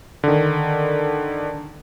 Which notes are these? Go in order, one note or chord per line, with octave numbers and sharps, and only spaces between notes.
D3 D#3